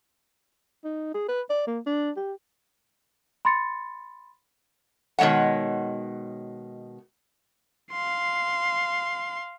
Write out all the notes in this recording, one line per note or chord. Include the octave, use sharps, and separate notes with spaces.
D#4
G#4
B4
D5
A#3
D4
G4
B5 C6 A6 C#7
B2 D#3 G#3 C#5 F#5
F5 C6